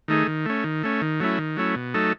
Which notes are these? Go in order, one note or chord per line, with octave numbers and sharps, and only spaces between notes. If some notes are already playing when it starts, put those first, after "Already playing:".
D#3 A3 D#4 G#4
D#3
A3 C#4
D#3
A3 C#4
D#3
F#3 A3 C#4 E4
D#3
F#3 A3 C#4 E4
B2
F#3 A3 D#4 A4